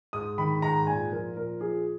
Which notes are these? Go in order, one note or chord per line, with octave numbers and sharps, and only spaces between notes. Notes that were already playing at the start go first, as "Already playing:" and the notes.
G#2 D#6
D#3 B5
G#2 A#5
A#2 G#5
F3 A#4
A#2 A#4
F3 G#4